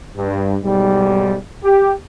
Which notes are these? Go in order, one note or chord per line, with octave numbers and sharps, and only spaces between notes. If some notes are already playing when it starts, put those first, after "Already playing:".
G2
B1 G#2 G3
G4